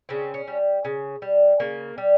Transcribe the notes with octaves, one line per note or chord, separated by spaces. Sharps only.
C#3 C4
C#4
G3
C#3
G3
C#3 A#3
G3